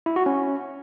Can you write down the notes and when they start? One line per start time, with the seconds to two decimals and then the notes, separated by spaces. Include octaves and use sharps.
0.06 E4
0.16 F#4
0.26 C#4